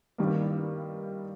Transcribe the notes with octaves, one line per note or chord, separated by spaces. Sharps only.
G2 D#3 G3 A#3